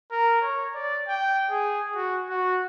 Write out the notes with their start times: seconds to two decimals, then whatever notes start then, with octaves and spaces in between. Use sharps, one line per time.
0.11 A#4
0.42 C#5
0.75 D5
1.08 G5
1.50 G#4
1.95 F#4
2.29 F#4